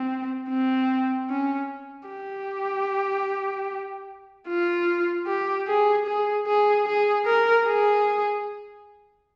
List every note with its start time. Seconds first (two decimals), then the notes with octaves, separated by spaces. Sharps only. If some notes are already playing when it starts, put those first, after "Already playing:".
Already playing: C4
0.49 C4
1.30 C#4
2.09 G4
4.48 F4
5.27 G4
5.68 G#4
6.07 G#4
6.47 G#4
6.86 G#4
7.26 A#4
7.66 G#4